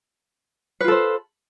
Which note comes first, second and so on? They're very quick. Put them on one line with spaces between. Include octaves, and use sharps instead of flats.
B4 F4 A4 C5